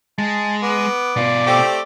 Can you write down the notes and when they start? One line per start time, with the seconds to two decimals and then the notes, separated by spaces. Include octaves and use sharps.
0.18 G#3 A5
0.63 B3 D6
1.16 B2 F4 D5
1.47 A3 C4 G4